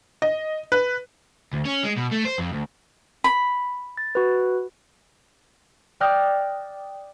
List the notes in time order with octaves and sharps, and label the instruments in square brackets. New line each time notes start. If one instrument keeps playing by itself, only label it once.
[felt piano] D#5
B4
[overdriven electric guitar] D2
C#4
G#3
B2
A3
C5
F2
D2
[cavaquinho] B5
[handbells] A6
F#4 B4
[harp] D5 G5 D#6 F6 F#6 A#6